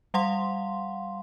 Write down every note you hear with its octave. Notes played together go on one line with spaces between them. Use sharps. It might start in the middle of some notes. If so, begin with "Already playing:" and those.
G3 F5 F#5 C6